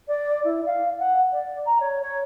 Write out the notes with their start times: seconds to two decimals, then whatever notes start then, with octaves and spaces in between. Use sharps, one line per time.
0.07 D5
0.44 E4
0.66 F5
0.99 F#5
1.32 D5
1.65 A#5
1.80 C#5
2.02 C#5